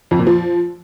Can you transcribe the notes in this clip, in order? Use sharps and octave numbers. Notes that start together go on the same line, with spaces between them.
F2
A#2
F3